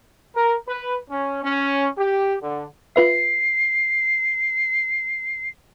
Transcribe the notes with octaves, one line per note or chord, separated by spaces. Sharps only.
A#4
B4
C#4
C#4
G4
D3
F4 B4 E5 C7